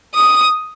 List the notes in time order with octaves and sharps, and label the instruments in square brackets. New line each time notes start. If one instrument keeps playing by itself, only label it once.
[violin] D#6